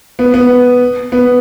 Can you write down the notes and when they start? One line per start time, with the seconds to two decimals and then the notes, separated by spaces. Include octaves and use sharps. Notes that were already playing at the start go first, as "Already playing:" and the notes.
0.19 B3
0.34 B3
1.12 B3